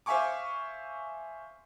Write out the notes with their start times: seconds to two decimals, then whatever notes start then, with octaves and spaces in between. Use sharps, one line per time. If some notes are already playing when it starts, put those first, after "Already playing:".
0.06 C5 E5 F5 G#5 C#6 D6